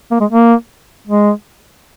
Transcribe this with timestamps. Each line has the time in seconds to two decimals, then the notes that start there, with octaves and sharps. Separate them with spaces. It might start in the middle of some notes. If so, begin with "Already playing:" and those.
0.11 A#3
0.21 G#3
0.31 A#3
1.07 G#3